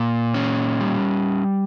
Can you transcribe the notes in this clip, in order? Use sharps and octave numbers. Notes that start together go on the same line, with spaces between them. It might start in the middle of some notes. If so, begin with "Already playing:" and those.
Already playing: A#2
C#4
G3